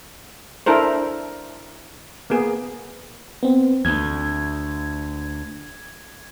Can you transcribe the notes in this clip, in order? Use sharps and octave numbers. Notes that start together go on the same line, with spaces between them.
D4 E4 A4 A#4 C5
A#3 B3 G#4
B3 C4
D2 G#6